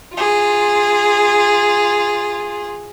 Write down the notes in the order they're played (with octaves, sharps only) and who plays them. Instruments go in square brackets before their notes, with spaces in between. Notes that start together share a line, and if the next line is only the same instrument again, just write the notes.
[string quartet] F4 G#4